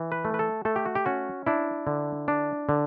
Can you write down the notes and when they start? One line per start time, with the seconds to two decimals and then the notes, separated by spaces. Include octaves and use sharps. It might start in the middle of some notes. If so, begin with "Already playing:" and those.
Already playing: E3
0.12 B4
0.25 A3
0.34 B4
0.39 A4
0.65 A3 A4
0.76 G4
0.85 F#4
0.95 G4
1.06 C#4 F#4
1.47 D4 E4
1.87 D3
2.28 D4
2.69 D3